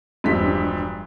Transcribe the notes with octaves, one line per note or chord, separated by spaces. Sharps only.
E1 G2 F3 B6